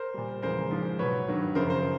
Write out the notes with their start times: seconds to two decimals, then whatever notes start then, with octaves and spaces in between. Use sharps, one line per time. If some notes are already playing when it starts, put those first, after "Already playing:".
Already playing: A#4 C5
0.14 A#2 G3
0.42 E2 C#3 F3 G#3 A#4 C5
0.71 G#2 F3 G#3
0.99 B2 F#3 B4 C#5
1.28 G2 D#3 F#3
1.55 F#2 C#3 F3 A#4 C5
1.70 A#4 C5